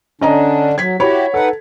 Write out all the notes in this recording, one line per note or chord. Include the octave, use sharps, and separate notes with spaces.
D3 C#4 D4 D#5 A#5
F#3 G#6 B6
E4 F#4 G4 C#5 B5
D#4 A4 B4 F#5